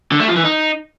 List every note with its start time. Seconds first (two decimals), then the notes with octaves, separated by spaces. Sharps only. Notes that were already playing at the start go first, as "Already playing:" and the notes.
0.12 D3
0.20 A3
0.28 F3
0.36 E3
0.44 D#4